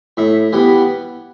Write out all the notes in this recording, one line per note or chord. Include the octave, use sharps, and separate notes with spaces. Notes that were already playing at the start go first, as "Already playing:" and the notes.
A2 E5
E3 G3 B3